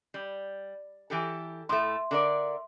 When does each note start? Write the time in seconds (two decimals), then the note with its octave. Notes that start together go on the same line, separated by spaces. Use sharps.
0.14 G3
1.10 E3 G4 A4
1.69 A2 A3 E5 C6
2.11 D3 A#4 D5